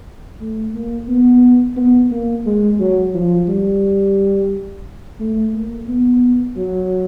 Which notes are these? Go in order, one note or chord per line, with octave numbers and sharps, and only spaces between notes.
A3
A#3
B3
B3
A#3
G#3
F#3
F3
G3
A3
A#3
B3
F#3